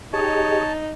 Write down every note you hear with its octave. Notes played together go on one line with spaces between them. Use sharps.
D#4 G4 G#4 C#5 D#5 A5